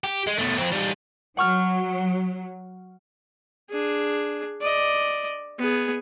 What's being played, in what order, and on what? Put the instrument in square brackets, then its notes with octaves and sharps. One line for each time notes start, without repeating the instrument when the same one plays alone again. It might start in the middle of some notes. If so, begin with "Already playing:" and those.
[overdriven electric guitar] G4
G#3
B2 A3
F2 C4
G3 D#4
[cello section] F#3 [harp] F#5 C#6 F6
[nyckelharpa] D4 G#4
D5 D#5
B3 G#4